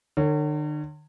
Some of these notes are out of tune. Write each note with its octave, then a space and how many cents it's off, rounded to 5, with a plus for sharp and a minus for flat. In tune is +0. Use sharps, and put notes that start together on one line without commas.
D3 +45 C#5 +0